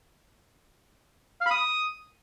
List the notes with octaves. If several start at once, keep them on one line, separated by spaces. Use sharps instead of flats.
F5
B5
D#6